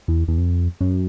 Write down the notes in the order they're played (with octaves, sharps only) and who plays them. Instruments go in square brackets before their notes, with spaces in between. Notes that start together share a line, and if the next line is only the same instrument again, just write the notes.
[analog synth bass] E2
E2
F2
F#2